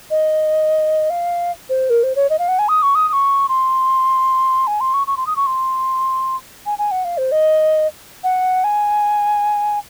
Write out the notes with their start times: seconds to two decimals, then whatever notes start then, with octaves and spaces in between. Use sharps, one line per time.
0.10 D#5
1.10 F5
1.70 C5
1.90 A#4
2.03 C5
2.16 C#5
2.30 D#5
2.39 F5
2.48 F#5
2.59 G#5
2.69 D#6
2.83 C#6
2.95 D#6
3.08 D#6
3.13 C#6
3.49 C6
4.67 G#5
4.81 C6
4.94 C#6
5.07 C#6
5.17 C6
5.27 D#6
5.36 C#6
5.46 C6
6.66 G#5
6.78 G#5
6.91 F#5
7.05 F5
7.18 C5
7.32 D#5
8.24 F#5
8.64 G#5